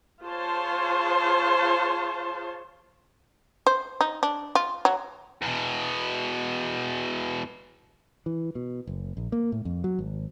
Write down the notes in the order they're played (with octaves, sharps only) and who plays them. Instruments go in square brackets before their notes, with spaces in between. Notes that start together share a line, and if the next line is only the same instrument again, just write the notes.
[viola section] F4 G#4 C5 C#5 A5
[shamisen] C5
D#4
D4
F4
F#3
[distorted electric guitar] E2 B2
[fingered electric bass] E3
B2
F#1
A#1
A#3
A2
F2
F#3
G#1